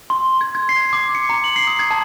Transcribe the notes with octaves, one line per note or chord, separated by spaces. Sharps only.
C6
G#6
G#6
C7
D6
C#7
A#5
F#7
C7
D#6
G#6
A5